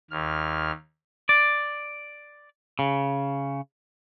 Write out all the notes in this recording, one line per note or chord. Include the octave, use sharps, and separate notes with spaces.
D#2 F6
D5
C#3